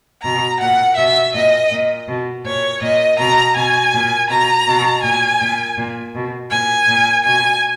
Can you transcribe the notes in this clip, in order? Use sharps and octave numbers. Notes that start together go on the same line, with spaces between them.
B2 A#5
A#2 F#5
B2 E5
A#2 D#5
A#2
B2
A#2 C#5
A#2 D#5
B2 A#5
B2 G#5
A#2
B2 A#5
B2
A#2 G#5
A#2
A#2
B2
A#2 G#5
A#2
B2 G#5